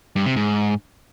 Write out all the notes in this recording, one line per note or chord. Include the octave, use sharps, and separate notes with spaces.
G2
C3
G#2